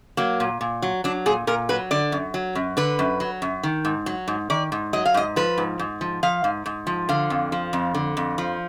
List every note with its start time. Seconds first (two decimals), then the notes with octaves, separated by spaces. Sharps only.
0.17 F#3 A#3
0.40 A#2
0.61 A#2
0.82 F#3
1.04 F#3 D4
1.26 A#2 G#4
1.47 A#2 A#4
1.69 F#3 B4
1.91 D3 D5
2.12 F#2
2.34 F#3
2.55 F#2
2.77 D3 B4
2.99 F#2
3.20 F#3
3.42 F#2
3.63 D#3
3.85 G#2
4.06 F#3
4.28 G#2
4.50 D#3 D5
4.72 G#2
4.93 F#3 D#5
5.06 F5
5.14 G#2 D#5
5.36 F3 B4
5.58 G#2
5.79 G#2
6.01 F3
6.23 F3 F5
6.44 G#2
6.66 G#2
6.87 F3
7.09 D3 F5
7.30 F2
7.52 F3
7.73 F2
7.95 D3
8.17 F2
8.38 F3